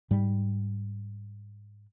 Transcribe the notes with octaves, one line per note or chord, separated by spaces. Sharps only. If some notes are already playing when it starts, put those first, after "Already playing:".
G#2 G3